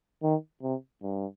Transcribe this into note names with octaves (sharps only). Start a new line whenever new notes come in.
D#3
C3
G2